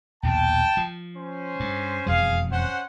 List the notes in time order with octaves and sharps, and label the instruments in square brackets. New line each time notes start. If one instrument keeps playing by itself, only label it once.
[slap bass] A#1 D#2 B2 [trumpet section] G5 A5
[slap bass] F3
[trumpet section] C#4 C5
[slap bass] G2
[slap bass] E1 F2 F#3 [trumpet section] G#4 F5
[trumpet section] C#4 C5 F#5